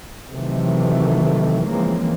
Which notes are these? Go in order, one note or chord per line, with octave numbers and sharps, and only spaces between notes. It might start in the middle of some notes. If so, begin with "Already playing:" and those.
C3 D#3 E3 F#3 A3
C#3 E3 F3 G#3 A#3 C4